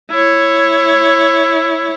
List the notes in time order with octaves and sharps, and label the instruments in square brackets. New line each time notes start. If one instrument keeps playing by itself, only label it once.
[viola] E4 C#5